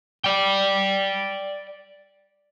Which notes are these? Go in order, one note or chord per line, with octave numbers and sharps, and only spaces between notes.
D5 G5